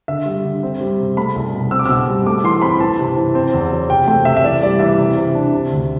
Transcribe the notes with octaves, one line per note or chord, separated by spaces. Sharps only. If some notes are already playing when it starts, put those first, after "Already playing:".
D3 E5
G3
D3
C4
G3
C3
A3 B5
C2
B2
C4 E6
D6
B2 E6
G3
A3 D6
E3 C6
C4 B5
E3 A5
C3
E3
C4
E2
F#3
C3 G5
A3 G5
C3 E5
E5
E3 D5
G3 D5
E3 E5
C3
C3
D4
C3
D2